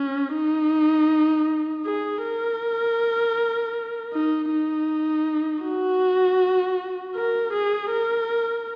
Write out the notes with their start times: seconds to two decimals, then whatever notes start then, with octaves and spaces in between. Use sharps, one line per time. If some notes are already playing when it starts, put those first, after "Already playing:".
Already playing: C#4
0.35 D#4
1.86 G#4
2.24 A#4
4.13 D#4
4.51 D#4
5.64 F#4
7.16 A#4
7.53 G#4
7.91 A#4